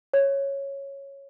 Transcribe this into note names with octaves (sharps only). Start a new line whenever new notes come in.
C#5